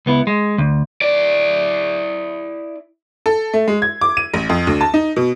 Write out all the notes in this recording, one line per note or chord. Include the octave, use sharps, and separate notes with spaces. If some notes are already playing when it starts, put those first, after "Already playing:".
C#2 B3 E4
G#3
D2
E4 D5
A4
A3
G#3
G#6
D6
D#7
A1
F2
D2
A5
D#4
B2